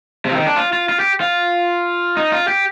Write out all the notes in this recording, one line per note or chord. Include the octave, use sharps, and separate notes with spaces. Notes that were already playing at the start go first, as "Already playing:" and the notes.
C3
F3
D#3
D4
F4
F4
F4
G4
F4
D#4
F4
G4